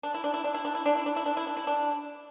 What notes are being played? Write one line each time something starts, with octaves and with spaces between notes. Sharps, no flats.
D4
E4
D4
E4
D4
E4
D4
E4
D4
E4
D4
E4
D4
E4
D4
E4
D4